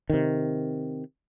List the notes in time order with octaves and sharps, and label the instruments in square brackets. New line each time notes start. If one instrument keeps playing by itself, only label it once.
[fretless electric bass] C3 D#3